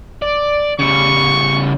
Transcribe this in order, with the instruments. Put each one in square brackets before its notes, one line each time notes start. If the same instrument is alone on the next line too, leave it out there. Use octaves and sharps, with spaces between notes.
[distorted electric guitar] D5
[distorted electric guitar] C#3 G3 [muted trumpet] C#6